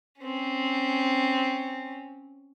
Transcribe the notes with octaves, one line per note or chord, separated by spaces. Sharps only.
C4 C#4